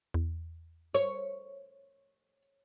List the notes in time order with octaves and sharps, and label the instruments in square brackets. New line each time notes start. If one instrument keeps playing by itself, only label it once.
[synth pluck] E2
[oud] C#5